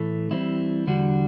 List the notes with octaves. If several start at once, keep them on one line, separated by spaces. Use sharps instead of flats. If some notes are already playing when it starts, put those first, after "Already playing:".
Already playing: A2 E3 A3
E3 G3 C4 E4
E2 D3 G3 D4 F#4